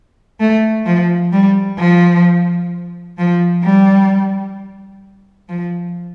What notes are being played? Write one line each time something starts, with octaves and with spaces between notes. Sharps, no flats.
A3
F3
G3
F3
F3
G3
F3